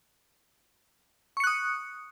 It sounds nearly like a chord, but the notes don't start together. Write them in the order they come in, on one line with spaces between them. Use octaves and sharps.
C#6 C#7 F#6 D#6